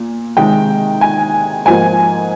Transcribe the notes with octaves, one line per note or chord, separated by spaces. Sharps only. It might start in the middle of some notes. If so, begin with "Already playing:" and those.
Already playing: A#2
C3 D#3 G#3 G5
G#5
G#2 F3 A#3 G#5